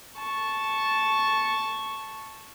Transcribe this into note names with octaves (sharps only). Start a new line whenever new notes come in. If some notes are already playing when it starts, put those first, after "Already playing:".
A5 C#6